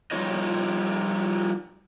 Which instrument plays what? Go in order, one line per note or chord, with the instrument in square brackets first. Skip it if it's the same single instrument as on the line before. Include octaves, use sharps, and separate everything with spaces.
[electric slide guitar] F3 G3 D#4 F4 C#5 D#5